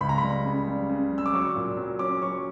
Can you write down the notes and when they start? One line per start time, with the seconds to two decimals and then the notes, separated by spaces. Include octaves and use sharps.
0.01 C#2 B5
0.09 A#5
0.18 G3 B5
0.45 C#3
0.68 G3
0.89 C#3
1.12 G3
1.18 E6
1.26 D6
1.33 F#3 C#6
1.56 A#2
1.77 F#3
1.99 C#4 D6
2.22 F#3 C#6